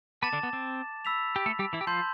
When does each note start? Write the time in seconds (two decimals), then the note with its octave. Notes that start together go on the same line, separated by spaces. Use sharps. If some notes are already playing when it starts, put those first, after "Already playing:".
0.22 B3 B4 A5 D6 A6 E7
0.33 D3 D4
0.43 B3
0.53 C4
1.05 B5 E6 B6 F7
1.36 G4
1.46 A3 A4
1.59 G3 G4
1.73 E3 E4
1.81 G4
1.87 F3 F4 A5 C6 G6